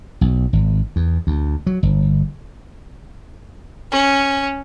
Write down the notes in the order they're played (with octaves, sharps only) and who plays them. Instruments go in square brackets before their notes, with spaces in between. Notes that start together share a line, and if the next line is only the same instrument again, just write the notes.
[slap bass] B1
G#1
E2
D2
F#3
G1
[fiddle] C#4